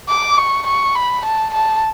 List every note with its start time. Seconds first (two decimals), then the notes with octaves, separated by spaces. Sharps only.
0.09 D6
0.38 C#6
0.67 C#6
0.95 B5
1.26 A5
1.54 A5